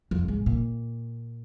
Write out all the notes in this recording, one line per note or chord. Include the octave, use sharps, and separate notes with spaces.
F2
G#2
A#2